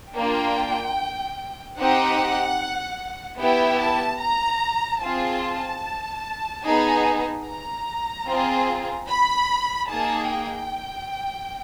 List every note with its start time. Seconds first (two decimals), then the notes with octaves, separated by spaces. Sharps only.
0.15 A#3 D4 F4 G5
1.78 C4 D#4 G4 F#5
3.39 B3 E4 G4 G5
3.80 A5
4.21 A#5
5.02 C4 F4 G#4 A5
6.64 B3 D#4 G#4
7.46 A#5
8.27 C4 F4 G#4
9.08 B5
9.89 A#3 D#4 G#4 A5
10.30 G5